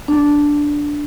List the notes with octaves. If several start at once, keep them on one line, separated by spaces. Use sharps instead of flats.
D4